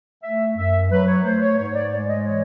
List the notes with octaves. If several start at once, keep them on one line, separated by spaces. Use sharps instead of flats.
A3 E5
F#2 E5
F#3 B4
C#5
A3 C5
C#5
G#2 C#5
D5
G#3 D5
D#5
E3 C#5